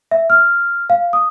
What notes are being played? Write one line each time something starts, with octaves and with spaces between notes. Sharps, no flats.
E5
F6
F5
D#6